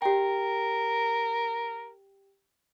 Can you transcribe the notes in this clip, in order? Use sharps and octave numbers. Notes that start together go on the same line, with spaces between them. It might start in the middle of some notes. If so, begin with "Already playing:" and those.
G4 A#4 G5